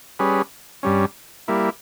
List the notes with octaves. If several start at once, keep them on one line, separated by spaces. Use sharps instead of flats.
G3 C#4 G#4 B4
G2 G3 C#4
G3 A#3 E4